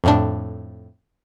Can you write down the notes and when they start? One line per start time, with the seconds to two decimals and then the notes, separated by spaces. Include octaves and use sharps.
0.04 F2 A2 D4